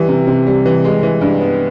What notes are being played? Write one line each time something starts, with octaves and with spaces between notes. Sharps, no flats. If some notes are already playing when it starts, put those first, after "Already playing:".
Already playing: E3 G3
C3
C3
G3
E3
G#3
E3
G2
B3